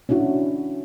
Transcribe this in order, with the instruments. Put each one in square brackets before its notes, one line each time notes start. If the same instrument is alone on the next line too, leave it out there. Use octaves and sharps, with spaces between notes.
[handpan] C#4 D4 E4 F#4